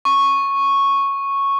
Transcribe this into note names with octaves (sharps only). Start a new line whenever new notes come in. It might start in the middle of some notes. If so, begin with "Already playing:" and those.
C#6